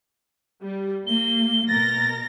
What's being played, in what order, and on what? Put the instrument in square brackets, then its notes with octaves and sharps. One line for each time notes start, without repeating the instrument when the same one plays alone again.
[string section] G3
[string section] A#3 [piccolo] G7
[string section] B2 A#4 A#6 [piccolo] A6